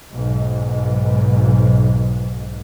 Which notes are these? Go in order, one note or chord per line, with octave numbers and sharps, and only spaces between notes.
B1 G#2